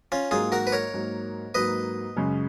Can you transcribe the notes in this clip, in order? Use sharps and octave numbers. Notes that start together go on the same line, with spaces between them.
C#4 F4
G#2 F#3 A#3 F4 G#4
F#4 A#4
B4
A#4 C#5
G#2 F#3 A#3
G#2 F#3 A#3 B4 D#5
F#2 C#3 G#3 C#4